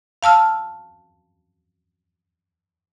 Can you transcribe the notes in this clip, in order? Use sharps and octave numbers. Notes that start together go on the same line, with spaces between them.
F5 A5 E6 F6